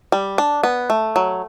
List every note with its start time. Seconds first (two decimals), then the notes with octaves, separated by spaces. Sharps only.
0.12 G3
0.38 D4
0.63 B3
0.90 A3
1.16 F#3